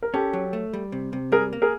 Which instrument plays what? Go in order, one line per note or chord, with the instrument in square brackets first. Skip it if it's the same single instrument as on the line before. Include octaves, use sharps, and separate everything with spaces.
[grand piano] A#4
[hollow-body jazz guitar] C#4 [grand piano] G4 A4
[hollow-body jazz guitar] F#3
A3
G3
C3
C3
[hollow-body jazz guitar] G3 [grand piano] G#4 A#4
[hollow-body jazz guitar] A#3
[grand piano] G#4 A#4